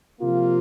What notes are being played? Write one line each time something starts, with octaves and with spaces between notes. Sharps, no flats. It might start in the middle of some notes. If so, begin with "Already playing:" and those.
C3 F3 A#3 F4